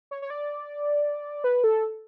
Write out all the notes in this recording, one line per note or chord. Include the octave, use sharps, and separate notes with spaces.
C#5
C#5
D5
B4
A4